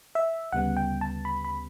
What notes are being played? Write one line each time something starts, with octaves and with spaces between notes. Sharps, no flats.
E5
D2 C#3 G3 B3 F#5
G5
A5
B5
B5